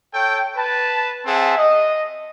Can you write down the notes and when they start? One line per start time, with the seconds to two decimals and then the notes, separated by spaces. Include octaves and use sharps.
0.14 A4 C#5 G5
0.57 B4 A5
1.26 C4 G#4 E5 F#5 A5
1.58 D#5